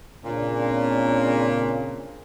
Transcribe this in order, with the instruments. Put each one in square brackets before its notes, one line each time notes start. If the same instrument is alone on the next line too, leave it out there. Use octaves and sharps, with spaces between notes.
[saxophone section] A#2 [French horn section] C#3 C4 D4